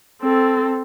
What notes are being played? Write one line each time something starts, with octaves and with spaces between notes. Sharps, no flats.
C4 A4